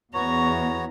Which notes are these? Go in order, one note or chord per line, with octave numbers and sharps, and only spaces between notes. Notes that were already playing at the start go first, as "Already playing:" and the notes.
E2 B3 F#4 C#5 A#5 C#6